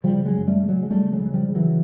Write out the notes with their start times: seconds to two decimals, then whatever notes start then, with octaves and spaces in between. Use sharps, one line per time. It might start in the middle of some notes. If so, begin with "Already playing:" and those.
0.04 C#3 F3 G3
0.26 F#3 G#3
0.34 F#2
0.47 G3 A3
0.63 C#3
0.69 F#3 G#3
0.83 G#3
0.90 C#3 G3 A3
1.13 F#3 G#3
1.20 C#3
1.26 F#3
1.34 F3 G3
1.49 C#3
1.55 E3 F#3